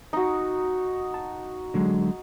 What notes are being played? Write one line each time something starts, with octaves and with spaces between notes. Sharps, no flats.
D#4 F#4
A5
D3 F#3 G#3